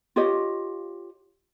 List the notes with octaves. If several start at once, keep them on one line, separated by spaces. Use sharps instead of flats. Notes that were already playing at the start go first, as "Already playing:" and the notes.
F4 G4 C#5 D#5